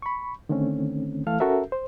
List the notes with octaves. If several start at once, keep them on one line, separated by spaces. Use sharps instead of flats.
B5 C#6
D3 D#3 A3 C4 C#4
E3 A3 A4 F5 F6
C#4 F#4 A4 A#4 E5
C5